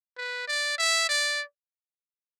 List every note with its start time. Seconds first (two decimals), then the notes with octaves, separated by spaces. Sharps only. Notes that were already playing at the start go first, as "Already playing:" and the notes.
0.17 B4
0.48 D5
0.78 E5
1.09 D5